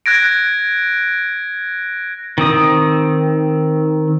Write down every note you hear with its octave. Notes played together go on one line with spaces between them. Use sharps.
F#6 G#6 A#6 D7
D#3 C4 D#6